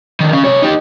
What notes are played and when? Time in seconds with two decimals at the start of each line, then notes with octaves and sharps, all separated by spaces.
0.20 D3 D#3
0.33 C#4 F5
0.45 C3 C#5
0.62 D#4 G4